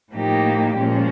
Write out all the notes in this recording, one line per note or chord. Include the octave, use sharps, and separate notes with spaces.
A2 F3 A#3 D#4 G4
A#2 F3 G#3 C#4